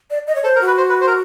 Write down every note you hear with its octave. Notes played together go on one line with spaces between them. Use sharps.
D5
D#5
C#5
A4 C5
A#4
F#4
B4
C5
B4
C5
A#4